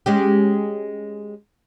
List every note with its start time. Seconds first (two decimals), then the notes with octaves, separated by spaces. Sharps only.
0.06 G#3 C#4 G4